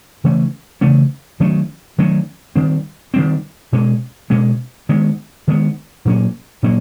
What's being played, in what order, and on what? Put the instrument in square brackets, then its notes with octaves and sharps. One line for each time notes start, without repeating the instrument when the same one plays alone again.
[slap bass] C#3 E3 A3 C#4
C#3 E3 A3 C#4
D#3 F#3 A3 C#4
D#3 F#3 A3 C#4
D#3 G3 C4
D#3 G3 C4
B2 G#3 C#4
B2 G#3 C#4
D#3 G#3 B3
D#3 G#3 B3
A#2 F#3 A#3 C#4
A#2 F#3 A#3 C#4